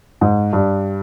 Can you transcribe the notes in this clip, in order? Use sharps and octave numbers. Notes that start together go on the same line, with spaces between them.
G#2
G2